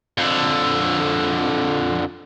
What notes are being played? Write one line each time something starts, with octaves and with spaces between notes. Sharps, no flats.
F2 D3